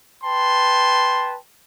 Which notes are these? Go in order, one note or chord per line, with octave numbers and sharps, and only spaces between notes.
B4 G5 A5 C6